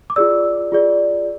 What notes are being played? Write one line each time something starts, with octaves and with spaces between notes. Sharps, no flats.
D6
F4 G#4 D5 E6
F4 G#4 D5